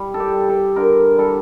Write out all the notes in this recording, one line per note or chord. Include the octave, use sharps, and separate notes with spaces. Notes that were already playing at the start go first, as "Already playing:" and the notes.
Already playing: G3
A4
G4
G3
A4
D3 A#4
G3 A4